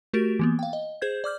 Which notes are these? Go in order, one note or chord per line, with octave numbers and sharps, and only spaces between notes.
A3 F#4 G4 A#4 A6 D7
E3 A#3 B3
F5 G5
D#5
G#4 C5 G6 G#6
D5 D6 F6 G6